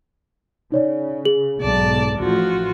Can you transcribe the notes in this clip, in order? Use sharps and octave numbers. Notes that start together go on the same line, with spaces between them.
C#3 D#4 C#5 D5
G#4 F#7
B1 G#2 D5 A5
A1 F3 F4 F#4